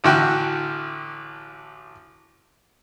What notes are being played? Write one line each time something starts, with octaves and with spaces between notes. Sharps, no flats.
A1 D3 F#4 G5